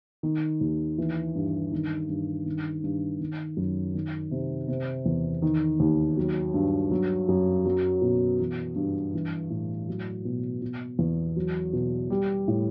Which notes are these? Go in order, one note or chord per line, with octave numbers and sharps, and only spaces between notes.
D#3
D#2
E3
G2
D#3
G2
D#3
G2
D#3
F#2
D#3
C3
C3
E2
D#3
D#2
F#3
G2
F#3
F#2
F#3
B2
E3
G2
E3
A2
F#3
B2
B2
E2
F#3
B2
G3
A2